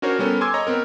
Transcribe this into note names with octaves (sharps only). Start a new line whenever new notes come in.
C#4 D4 F#4 A#4 C5 C#5
G3 B3 C#4 A4 A#4
G#5 C6 D6 E6 G#6
C#5 D#5 A#5 C#6
B3 C4 A#4